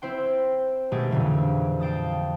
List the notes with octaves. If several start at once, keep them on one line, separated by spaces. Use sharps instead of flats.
C4 E4 C5 G5
B2 D#3 G#3 A3 G4 G#4
F2 A#2 D3 E3
F5 G5 A5 D#6